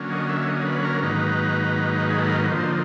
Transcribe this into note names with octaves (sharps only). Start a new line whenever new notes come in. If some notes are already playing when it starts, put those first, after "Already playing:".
Already playing: D3 F#3 A#3 C#4
D#5
E5
D#5
B4
A#4
G#2 D#3 F#3 A#3 D#4 B4
G#4
A4
A#4
B4
D3 F3 A#3 D#4 C5